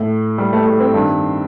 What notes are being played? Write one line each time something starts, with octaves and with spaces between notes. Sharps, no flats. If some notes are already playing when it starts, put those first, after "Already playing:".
Already playing: A2
G3
A3
A3
C4
G2 D#3